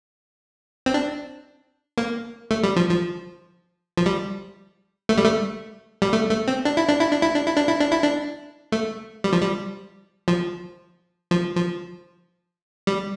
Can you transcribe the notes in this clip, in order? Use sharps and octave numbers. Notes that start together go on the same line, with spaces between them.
C4
D4
A#3
A3
G3
F3
F3
F3
G3
A3
G3
A3
G3
A3
A3
C4
D4
E4
D4
E4
D4
E4
D4
E4
D4
E4
D4
E4
D4
A3
G3
F3
G3
F3
F3
F3
G3